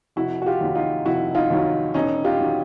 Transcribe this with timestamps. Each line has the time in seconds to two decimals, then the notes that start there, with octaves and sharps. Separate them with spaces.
0.16 F1 E4 F#4
0.42 F#4
0.46 F4 G4
0.61 D#2 D#3 F#3
0.75 D#4 F4
1.05 F1 E4 F#4
1.35 D#4 F4
1.50 D#2 D#3 F#3
1.94 E1 C#4 D#4
2.24 F4 G4
2.39 D#3 F#3